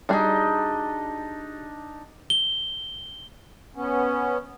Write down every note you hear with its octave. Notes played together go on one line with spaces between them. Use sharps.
G3 D4 D#4 F#4 G#4
G7
B3 C#4